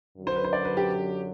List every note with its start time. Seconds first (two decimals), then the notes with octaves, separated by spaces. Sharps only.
0.18 F#2 D3 F#3
0.27 C5
0.36 B4
0.44 C5
0.53 D5
0.65 B4
0.77 G4